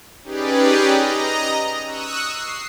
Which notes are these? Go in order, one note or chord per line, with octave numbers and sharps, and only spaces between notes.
C#4 D#4 G4 G#4 B4 D5
D#5 A#5
C#6 D#6 E6 F#6
C7